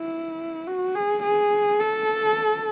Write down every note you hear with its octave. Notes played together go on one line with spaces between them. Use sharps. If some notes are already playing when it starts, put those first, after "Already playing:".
Already playing: E4
F#4
G#4
G#4
A4